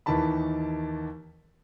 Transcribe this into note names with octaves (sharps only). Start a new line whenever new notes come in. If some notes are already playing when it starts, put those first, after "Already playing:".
D#2 D#3 E3 A5 B5